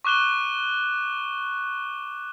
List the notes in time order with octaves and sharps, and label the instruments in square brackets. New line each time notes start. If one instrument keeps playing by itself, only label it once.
[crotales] C#6 D6 F#6 E7 G7